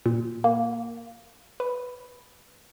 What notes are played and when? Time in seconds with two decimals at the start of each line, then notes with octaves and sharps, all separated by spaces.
0.06 A#2
0.44 A#3
1.60 B4